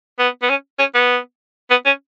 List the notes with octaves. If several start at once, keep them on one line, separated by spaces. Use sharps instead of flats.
B3
B3
C#4
C#4
B3
B3
C#4